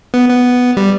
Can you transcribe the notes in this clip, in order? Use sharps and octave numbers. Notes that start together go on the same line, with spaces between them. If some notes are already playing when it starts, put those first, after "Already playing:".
B3
B3
G3